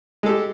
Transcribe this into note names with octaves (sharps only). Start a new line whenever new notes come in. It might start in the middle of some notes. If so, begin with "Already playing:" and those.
G#3 G4 A4